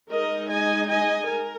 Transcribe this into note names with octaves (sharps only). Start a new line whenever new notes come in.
G#3 D#4 A#4 D#5
D#5 G#5
D#5 G#5
A#4